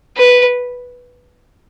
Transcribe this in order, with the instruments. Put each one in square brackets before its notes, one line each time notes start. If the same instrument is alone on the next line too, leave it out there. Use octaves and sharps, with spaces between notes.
[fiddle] B4